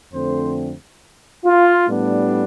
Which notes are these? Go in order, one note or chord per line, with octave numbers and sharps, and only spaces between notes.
F2 D3 A3 C4 C5
F4
A2 G3 B3 D4